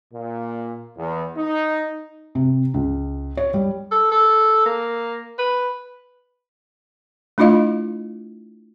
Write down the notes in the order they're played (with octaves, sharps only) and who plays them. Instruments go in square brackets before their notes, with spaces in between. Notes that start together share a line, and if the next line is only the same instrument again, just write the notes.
[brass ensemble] A#2
E2
D#4
[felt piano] C3
C#2
C#5
G3
[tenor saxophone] A4
A4
A#3
B4
[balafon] A3 D4 E4 F4 D#5 F5